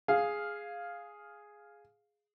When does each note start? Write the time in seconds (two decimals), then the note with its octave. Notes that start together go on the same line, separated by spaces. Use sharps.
0.08 G#4 F5